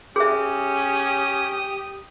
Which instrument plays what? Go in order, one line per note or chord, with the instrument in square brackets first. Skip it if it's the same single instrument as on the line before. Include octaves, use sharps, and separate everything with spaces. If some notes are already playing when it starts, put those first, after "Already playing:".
[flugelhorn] C#4 [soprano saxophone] G4 [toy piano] G#4 E5 [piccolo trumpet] D#6